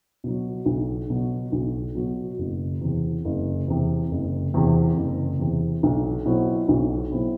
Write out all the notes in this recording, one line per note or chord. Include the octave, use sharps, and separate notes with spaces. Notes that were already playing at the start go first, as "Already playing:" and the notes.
B2 F#3
B1
B2 F#3
B1
B2 F#3
F#1
E2 C3
F#1
E2 C3
F#1
E2 C3
F#1
E2 C3
B1
B2 F#3 C4 E4
B1
B2 F#3 C4 E4